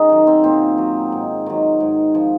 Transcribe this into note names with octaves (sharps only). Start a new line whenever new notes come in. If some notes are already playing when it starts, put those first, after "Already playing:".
Already playing: F#2 D#4 G#4
D#3 F#3
C4
A#2 C4
F#3
G#2
D#3 F#3
G#2
F3